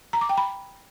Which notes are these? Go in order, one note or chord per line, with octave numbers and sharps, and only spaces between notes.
A#5
D6
G5
B5